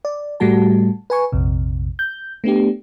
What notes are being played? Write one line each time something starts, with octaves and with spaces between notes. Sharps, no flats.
D5
A2 G3 A3 F#4 A5
B4 G#5 C#6
A#1 F2 C3
G6
A3 B3 D4 G4